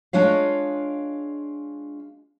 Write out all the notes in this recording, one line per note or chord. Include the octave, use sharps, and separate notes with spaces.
G#3 D4 F4 C#5 F5